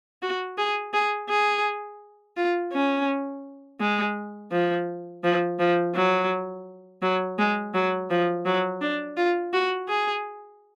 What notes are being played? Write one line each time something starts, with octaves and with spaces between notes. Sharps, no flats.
F#4
G#4
G#4
G#4
F4
C#4
G#3
F3
F3
F3
F#3
F#3
G#3
F#3
F3
F#3
D4
F4
F#4
G#4